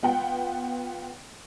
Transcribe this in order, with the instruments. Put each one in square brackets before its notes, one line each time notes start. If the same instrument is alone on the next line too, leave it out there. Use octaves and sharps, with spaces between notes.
[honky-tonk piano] B3 F4 F#5 G5